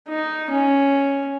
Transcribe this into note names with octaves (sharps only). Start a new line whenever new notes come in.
D#4
C#4